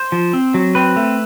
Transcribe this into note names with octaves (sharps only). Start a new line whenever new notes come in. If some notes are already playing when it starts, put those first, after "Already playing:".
Already playing: C5
F3
C4
F#3
C4 B4
A3